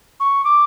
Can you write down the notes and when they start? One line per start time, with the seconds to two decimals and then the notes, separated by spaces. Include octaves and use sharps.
0.20 C#6
0.44 D6